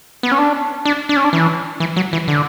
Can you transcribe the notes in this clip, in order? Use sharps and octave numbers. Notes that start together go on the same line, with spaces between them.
B3
C#4
D4
D4
D4
C#4
D4
E3
E3
F#3
E3
D3